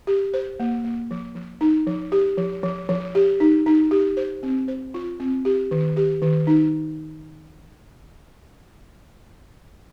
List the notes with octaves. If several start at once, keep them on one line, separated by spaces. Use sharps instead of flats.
G4
C5
A#3
A#3
F3
F3
D#4
F3
G4
F3
F3
F3
G4
D#4
D#4
G4
C5
C4
C5
F4
C4
G4
D#3
G4
D#3
D#4